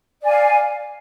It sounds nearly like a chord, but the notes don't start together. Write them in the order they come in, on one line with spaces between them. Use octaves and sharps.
D5 G#5 F5